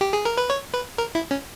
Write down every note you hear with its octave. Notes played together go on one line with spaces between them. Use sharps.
G4
G#4
A#4
B4
C#5
B4
A#4
E4
C#4